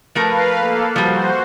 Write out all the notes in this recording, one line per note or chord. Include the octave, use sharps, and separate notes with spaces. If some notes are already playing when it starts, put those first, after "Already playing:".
F3 A3 A#4 B4 F5
A#3 A4
F3 G3 F#4 C5